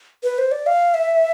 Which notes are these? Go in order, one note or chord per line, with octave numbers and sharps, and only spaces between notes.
B4
C5
D5
F5
E5